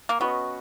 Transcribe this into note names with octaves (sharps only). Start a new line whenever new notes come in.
A#3
B3 C#4 F#4 B4 D#5